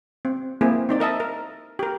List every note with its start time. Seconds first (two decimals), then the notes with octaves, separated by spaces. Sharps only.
0.25 C4
0.61 A#3 C4 E4 G#4
0.89 C4 D#4 D5
1.00 A#4 D#5 E5 A5
1.20 A#4
1.79 G4 A#4